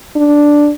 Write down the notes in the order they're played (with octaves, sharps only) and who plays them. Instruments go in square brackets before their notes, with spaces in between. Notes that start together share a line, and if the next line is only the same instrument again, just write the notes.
[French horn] D4